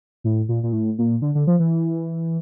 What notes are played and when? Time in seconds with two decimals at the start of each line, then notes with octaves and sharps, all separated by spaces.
0.24 A2
0.49 A#2
0.63 A#2
0.73 A2
0.98 A#2
1.22 D3
1.35 D3
1.47 F3
1.60 E3